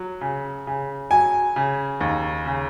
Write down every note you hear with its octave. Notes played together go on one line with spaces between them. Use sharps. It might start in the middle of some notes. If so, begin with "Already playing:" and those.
Already playing: F#3
C#3
C#3
F#3 G#5
C#3
D#2
C#3